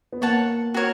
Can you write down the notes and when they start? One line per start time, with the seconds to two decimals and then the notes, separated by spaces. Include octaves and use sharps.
0.12 B3
0.21 A#3 C#5 F#5 A5
0.74 F#4 A#4 C#5